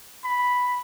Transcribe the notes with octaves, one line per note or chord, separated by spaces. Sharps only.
B5